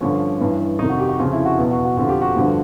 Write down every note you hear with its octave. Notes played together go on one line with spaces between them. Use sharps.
G2 D3 F3 C#4
G2 E3
F2 C3 D#3 D#4
F#4
G4
F#4
F2 C#3 F3 F4
E4
F#4
E2 B2
F#4
F#4
F2 D3 F3 F#4
G4
F#4
G2 D3 F3